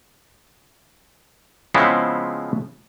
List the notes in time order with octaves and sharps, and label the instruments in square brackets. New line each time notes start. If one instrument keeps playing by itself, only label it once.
[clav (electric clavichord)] C#3 F3 G#3 B3 C4 E4